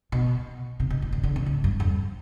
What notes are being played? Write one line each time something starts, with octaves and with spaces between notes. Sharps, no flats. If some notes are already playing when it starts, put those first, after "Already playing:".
B2
C3
B2
A2
D3
D3
C3
A2
G2
F2